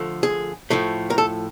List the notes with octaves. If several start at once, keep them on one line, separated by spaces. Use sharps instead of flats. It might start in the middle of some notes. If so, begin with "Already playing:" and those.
Already playing: D3 F3 A3
G#4
A2 F3 A3
A#4
A4